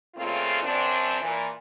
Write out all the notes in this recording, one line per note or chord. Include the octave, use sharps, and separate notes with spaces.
A#2 C#3 A3 C4 F4
F#2 C4 D4
A#2 E3